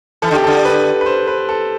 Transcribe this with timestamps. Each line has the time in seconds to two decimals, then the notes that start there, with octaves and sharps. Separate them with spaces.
0.22 E3 A4
0.31 D3
0.34 C3 G4
0.44 D3 A4
0.65 B4
1.01 B4
1.06 C5
1.27 B4
1.49 A4